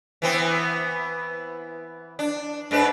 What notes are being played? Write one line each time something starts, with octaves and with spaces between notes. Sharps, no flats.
E3 B3 C4
D4
G#2 D4 B4